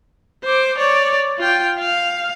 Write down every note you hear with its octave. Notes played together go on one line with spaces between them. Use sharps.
C5 D6
C#5 D5
F4 G5
F5